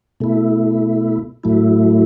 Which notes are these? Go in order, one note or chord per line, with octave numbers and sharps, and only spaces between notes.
B2 A3 E4
A2 F#3 A3 E4